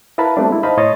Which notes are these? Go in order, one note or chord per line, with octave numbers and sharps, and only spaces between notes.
E4 A#4 B4 F5 A5 B5
G3 A3 B3 C4 D4
G#3 E4
D#4 C5 D#5 F5 A5 B5
A2 C#5 D#5 C6 A6